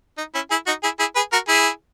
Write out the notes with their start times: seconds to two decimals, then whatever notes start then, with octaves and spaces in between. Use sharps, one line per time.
0.18 D#4
0.35 C#4 E4
0.50 E4 G#4
0.67 D#4 F#4
0.83 E4 G#4
0.99 E4 G#4
1.15 G#4 B4
1.32 F#4 A#4
1.48 E4 G#4